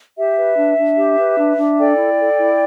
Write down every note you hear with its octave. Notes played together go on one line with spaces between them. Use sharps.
G4 E5
B4
D4
D4
G4
B4
D4
D4
A4 D5 G5
E4
A4
E4